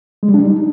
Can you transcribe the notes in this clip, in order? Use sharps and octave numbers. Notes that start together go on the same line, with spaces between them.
G#3
G3
D4
G3
D#4